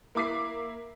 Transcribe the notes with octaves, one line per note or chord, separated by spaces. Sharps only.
A#3 E4 D6 B6 C7